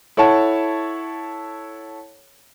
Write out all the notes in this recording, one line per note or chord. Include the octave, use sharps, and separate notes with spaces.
E4 A4 C#5 F#5 A5